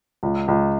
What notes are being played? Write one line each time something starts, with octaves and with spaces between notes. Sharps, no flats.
C#2
C#2